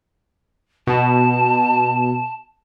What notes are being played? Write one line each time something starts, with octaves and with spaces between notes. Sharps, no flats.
B2 A5